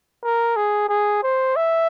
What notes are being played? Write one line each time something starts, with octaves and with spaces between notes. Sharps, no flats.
A#4
G#4
G#4
C5
E5